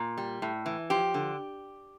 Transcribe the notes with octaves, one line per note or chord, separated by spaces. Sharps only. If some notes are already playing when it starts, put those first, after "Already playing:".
Already playing: A#2
G3
A2
E3
F3 G4
D3